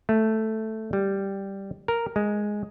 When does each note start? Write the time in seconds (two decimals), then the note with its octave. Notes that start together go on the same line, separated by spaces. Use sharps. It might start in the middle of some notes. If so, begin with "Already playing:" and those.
0.09 A3
0.93 G3
1.88 A#4
2.16 G#3